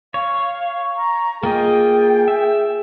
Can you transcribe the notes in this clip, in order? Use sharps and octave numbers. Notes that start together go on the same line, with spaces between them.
C#5 F5
A#5
A#3 F4 G#4 D#5 G5
E5